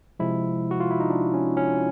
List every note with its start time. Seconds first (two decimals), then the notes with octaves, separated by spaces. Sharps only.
0.19 C3 F3 G#3 E4
0.71 F#4
0.80 F4
0.91 E4
1.00 D#4
1.10 D4
1.34 C#4
1.57 C#4